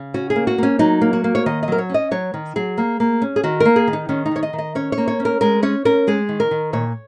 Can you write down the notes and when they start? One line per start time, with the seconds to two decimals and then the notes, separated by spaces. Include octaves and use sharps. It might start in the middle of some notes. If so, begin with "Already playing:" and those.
Already playing: C#3
0.14 C#4 F#4
0.30 G#4
0.36 A#3
0.47 F#4
0.58 A#3 C#4
0.79 F#3 D#4
1.01 A#3
1.13 F#4
1.24 A#3
1.35 C#5
1.46 D#3 D#5
1.63 D#5
1.68 F#3 A#4
1.78 C#5
1.90 C#4 D#5
2.11 F#3 C#5
2.34 D#3
2.56 F#3 G#4
2.78 A#3
3.00 A#3
3.22 C#4
3.36 G#4
3.43 D#3 F#4
3.60 A#3 A#4
3.76 G#4
3.88 D#3
3.93 D#4
4.09 D#3 C#4
4.26 D#4
4.31 D#3 C#5
4.43 D#5
4.53 D#3
4.58 D#5
4.75 C#4 C#5
4.92 C#5
4.98 A#3
5.08 C#5
5.20 C#4
5.25 A#4
5.41 G#3 A#4
5.63 C#4 C#5
5.85 C#4 A#4
6.07 G#3 G#4
6.29 D#3
6.40 A#4
6.51 D#3
6.73 A#2 C#5